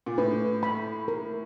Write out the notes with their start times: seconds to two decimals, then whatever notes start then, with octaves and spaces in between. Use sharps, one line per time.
0.06 A#2
0.18 A2 B4
0.63 B5
1.08 A#4